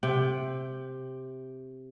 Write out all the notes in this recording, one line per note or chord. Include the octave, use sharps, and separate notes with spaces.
C3 G5